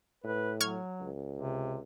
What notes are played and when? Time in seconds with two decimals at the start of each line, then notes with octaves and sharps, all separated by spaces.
0.24 A2 B4
0.61 F#3 C#6 F6 G#6
1.00 C#2
1.38 C3